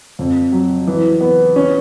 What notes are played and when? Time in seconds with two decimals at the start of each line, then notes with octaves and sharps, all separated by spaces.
0.19 F2
0.52 F#3
0.87 E3
1.21 B3
1.56 C#4